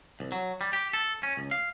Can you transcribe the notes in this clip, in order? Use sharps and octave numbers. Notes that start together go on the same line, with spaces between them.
C2
F#3
G3
G4
A4
C#4
C#2
F5